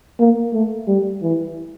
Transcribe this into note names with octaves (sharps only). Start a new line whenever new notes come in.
A#3
A3
G3
E3